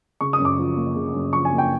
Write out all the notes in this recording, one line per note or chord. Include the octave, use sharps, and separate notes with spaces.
C#3 C#6
D#6
F#2
D6
F3
A#3
C#3
F#2
F3 C#6
G#5
A#3
G5